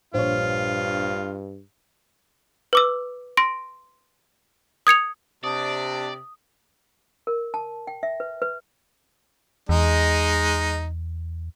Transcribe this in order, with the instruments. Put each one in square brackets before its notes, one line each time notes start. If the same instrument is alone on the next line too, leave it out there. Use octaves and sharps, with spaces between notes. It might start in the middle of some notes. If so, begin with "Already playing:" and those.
[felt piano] A#1 C#5 [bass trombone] G2 [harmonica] F4 [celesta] C5
[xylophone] B4 D6 E6
C6 A#6 D7
D#6 G#6 C#7 F7
[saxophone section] C3 [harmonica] D4 [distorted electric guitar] D5 [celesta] D#6
[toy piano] A#4
A5
G5
E5
B4
B4
[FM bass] E2 [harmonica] G#3 D#4